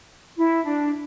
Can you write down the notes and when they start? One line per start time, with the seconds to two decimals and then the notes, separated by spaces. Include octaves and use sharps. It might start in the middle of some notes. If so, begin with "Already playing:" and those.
0.36 E4
0.64 D4